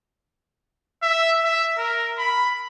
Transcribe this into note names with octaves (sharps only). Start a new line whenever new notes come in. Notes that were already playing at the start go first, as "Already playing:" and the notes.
E5
E5
A#4
B5